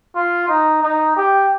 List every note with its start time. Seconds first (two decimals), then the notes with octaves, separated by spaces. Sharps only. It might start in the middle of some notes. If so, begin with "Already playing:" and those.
0.15 F4
0.48 D#4
0.83 D#4
1.17 G4